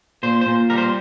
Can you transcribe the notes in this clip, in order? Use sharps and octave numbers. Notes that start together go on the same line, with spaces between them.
A#2 C5
C5
A#2
G3 A#4
C5